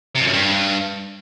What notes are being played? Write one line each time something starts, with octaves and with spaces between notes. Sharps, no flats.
C3
F2
F#2
G2